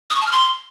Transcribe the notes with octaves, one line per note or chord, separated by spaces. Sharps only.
D#6
C#6
A5
F6
C6